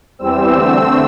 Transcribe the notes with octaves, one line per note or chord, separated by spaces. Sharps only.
E2 E3 G3 C4 E6
D3 A3 C4